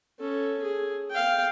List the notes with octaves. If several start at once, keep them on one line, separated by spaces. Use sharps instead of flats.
C#4 A4
G#4
F5 G5